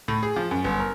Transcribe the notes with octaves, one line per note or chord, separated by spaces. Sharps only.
A2
G#4
F3
F#2
G1
A#4